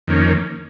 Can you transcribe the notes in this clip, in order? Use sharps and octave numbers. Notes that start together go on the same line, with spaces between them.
F2 D#3 A#3 C#4